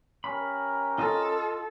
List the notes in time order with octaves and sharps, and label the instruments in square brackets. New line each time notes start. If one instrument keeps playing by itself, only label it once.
[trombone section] C#4 G4 A#4 [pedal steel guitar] B5
[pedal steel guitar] F4 D#5 [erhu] A4